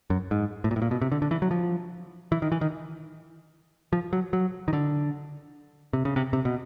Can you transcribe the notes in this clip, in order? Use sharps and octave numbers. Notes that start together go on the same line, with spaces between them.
F#2
G#2
A2
A#2
A2
A#2
B2
C3
D3
D3
E3
F#3
F3
E3
D#3
E3
D#3
F3
F#3
F#3
D#3
D3
C3
C#3
C3
C3
B2